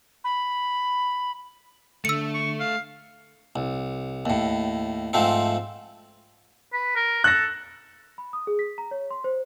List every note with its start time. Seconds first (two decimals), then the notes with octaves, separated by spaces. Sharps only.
0.24 B5
2.05 D3 A3 E6 C#7
2.34 C#6
2.60 F5
3.56 C2
4.26 D#2 A2
5.13 G#2 F3 A3 C4
6.73 B4
6.96 A#4
7.24 A4 F#6 A#6
8.18 B5
8.33 D#6
8.47 G#4
8.59 B6
8.78 A#5
8.91 C#5
9.11 C6
9.24 C5